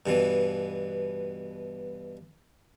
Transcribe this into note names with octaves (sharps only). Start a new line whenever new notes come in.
G2 B2 E3